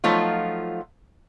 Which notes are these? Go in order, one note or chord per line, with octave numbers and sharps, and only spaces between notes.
F3 F#3 A3 D#4 F4